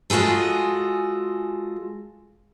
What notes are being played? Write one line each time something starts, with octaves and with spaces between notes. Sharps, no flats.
G#3 F4 F#4 G#4 A4